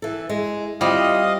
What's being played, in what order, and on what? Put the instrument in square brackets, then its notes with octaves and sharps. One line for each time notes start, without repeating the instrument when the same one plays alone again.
[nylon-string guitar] E3 A4
G#3
[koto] G3 [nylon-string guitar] C4 E4 F4 [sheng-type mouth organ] D#5 F5 D#6